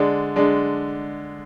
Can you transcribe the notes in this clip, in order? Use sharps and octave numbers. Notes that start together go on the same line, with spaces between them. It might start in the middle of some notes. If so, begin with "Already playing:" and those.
Already playing: D3 G#3 D4
D3 G#3 D4